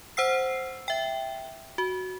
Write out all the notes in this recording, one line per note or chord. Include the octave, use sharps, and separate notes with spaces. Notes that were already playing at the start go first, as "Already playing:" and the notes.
C5 F#5 E6 C7
E5 G5
F#4